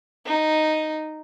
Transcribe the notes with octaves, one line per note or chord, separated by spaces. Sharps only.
D#4